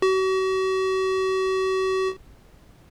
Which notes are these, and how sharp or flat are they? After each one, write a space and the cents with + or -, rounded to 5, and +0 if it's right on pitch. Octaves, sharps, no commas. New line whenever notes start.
F#4 +40